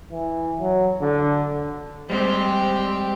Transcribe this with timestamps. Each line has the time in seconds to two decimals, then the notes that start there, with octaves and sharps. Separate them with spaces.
0.12 E3
0.59 F#3
1.01 D3
2.10 G3 G#3 C4 G4